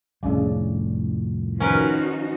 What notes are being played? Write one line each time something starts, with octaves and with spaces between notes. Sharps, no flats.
C2 F2 A2 C#3 D4
D#3 F3 C#4 D#4 F#4 A#4 B4